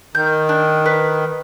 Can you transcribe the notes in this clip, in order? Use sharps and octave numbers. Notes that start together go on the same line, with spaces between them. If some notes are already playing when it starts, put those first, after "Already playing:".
D#3 G6
D4
B4